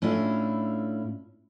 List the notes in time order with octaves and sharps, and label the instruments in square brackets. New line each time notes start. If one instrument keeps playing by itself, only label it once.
[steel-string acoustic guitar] A2 C#4 D4 E4 F4